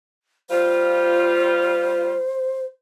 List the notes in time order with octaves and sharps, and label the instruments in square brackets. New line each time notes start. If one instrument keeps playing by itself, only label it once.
[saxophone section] G3 F4 [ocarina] C5